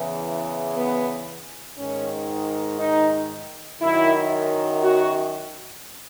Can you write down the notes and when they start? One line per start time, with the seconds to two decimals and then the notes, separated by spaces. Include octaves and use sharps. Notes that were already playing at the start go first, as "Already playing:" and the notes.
Already playing: E2 C#3 E3
0.76 B3
1.78 G#2 D#3 C#4
2.79 D#4
3.82 F#2 D#3 E4
4.83 F#4